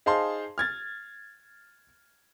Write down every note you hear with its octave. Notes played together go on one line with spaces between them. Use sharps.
D#4 G#4 C5 F5 A5 C6
F6 G#6 A6